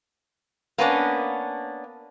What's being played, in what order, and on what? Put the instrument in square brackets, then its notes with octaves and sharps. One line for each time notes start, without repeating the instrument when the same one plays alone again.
[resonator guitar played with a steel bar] A#3 B3 C#4 D4